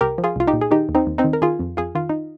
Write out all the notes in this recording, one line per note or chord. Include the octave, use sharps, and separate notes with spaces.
C2 G4 A#4
F3
F4 G#4
C2 F4
D#4 G4
A#2
G#4
D#3 D#4 G4
D#2
C4 D#4
D#2
C4 D#4
D#3
A#4
D#3 F4 G#4
F2
F2 F4 G#4
D#3 F4
D#4